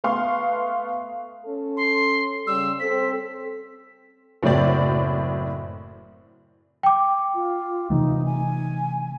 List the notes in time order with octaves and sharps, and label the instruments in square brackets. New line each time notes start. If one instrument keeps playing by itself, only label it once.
[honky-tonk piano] A3 B3 F5 C6 C#6
[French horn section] C#4 A4
[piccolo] C6
[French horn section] C#3 G3 [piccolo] E6
[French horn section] C4 A4 C5 [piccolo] B6
[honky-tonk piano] F#1 A2 F#3 C4 C5 D5
[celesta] G5 D6
[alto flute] F4
[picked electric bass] C3 E3 A3 [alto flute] D#4
[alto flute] G#5